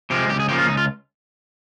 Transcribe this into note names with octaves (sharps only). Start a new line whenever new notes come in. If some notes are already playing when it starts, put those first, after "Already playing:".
C3 F3 G#3 G4
C#2 G4
G#4
C#3 F3 A#3 G4
F4
C#2 D#4
F4